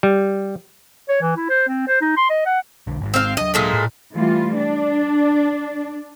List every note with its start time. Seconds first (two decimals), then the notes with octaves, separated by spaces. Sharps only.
0.03 G3
1.09 C#5
1.21 E3
1.36 E4
1.49 C5
1.68 C4
1.88 C5
2.01 D#4
2.17 C6
2.30 D#5
2.46 F#5
2.87 B1 D3
3.01 G#1 G#2 G#3
3.14 C4 F5
3.37 F#3 D4 D#5
3.54 A#2 G#3 A3
3.73 A2
4.12 E3 G3 A3 F4
4.56 D4